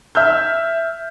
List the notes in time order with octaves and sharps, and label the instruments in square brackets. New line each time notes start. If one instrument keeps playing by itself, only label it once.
[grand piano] E5 E6 F6 G6